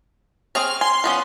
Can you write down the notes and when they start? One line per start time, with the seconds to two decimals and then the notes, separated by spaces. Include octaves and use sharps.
0.55 C4 G#4 C#5 F6
0.81 G#5 C6
1.04 F3 B3 C#4